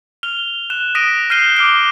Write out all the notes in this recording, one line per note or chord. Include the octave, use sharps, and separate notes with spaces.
F6 F7 G7
F#6 E7
D#6 A#6 B6 D7 D#7
F6 G6 C7 D#7 G7
D6 F6 D7 G7